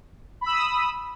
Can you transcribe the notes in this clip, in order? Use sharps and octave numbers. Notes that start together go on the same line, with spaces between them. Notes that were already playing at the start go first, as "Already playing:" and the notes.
B5 D#6 E6